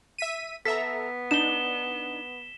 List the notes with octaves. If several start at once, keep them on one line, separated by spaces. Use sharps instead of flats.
E5 B6 D#7
B3 A4 E5 A#5 B6
D4 D#4 E7 G7